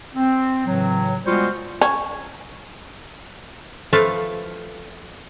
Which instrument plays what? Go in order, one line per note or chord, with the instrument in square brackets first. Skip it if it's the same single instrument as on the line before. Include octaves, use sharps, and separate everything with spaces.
[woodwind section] C4
A2 C#3 E3 F#3
G3 G#3 B3 F4 F#4 C5
[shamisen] C#4
[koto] F3 A3 B4 F5